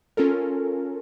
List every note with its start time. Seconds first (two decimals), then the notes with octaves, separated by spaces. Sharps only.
0.17 C#4 F4 A4 A#4